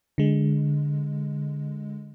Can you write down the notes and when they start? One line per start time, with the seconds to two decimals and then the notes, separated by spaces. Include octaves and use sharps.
0.18 D3 G#3